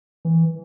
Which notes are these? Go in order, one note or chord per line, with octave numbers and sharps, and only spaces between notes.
E3